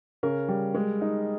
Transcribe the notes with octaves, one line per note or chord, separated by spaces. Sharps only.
C#3 A#4
G3
G#3
D#4